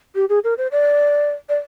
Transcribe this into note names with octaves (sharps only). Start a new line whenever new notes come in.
G4
G#4
A#4
C5
D5
D5